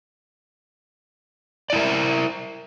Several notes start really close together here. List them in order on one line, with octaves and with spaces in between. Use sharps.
D5 E4 A#4 E5